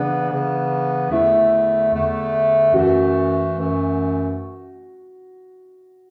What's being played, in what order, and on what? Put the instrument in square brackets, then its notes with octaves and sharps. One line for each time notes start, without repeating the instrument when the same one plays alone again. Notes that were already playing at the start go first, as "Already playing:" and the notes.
Already playing: [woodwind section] C#3 E3 B3 [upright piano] D4
[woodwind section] C#3 E3 B3
[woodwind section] E2 D3 A3 [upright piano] E4
[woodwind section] E2 D3 A3
[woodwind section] F#2 E3 A3 [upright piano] F#4
[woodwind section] F#2 E3 A3